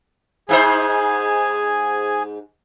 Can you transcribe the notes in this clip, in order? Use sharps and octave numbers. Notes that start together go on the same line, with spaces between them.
G#2 D#4 G#4 C5 G#5